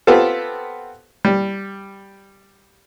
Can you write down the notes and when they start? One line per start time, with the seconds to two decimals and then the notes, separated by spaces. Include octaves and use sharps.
0.07 B3 C4 F4 G4 A4
1.25 G3